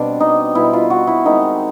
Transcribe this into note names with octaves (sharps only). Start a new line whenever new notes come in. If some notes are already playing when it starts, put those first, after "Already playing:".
Already playing: B2 G3 C4 D4
D#4
B2 G3 C4 E4
F4
F#4
E4
D#3 G#3 C4 D#4